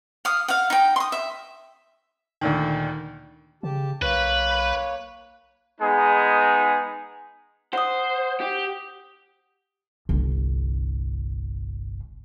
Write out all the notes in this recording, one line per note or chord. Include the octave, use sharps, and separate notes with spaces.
F5 D#6
F5 F#5
D#4 G5
C6 D#6
E5
D2 A#2 D#3
C#3 G4 A5
B1 A#3 B4 C#5 F#6
G#3 B3 D#4 G#4
C5 F#5 D#6
G4
G1 C2